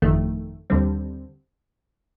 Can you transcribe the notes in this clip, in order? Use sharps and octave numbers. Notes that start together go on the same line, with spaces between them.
G1 F2 D#3 A3
D#2 D3 G3 C4